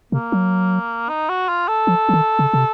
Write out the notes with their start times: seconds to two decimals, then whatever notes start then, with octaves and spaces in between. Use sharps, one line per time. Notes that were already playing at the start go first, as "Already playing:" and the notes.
0.12 C3 A#3
0.32 F#3
1.09 D#4
1.29 F#4
1.49 F4
1.68 A4
1.87 F3
2.09 F3
2.13 D#3
2.39 C#3
2.54 C3